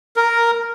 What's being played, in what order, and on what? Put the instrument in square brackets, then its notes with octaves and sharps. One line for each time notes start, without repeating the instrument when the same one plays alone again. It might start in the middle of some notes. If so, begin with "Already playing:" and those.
[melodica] A#4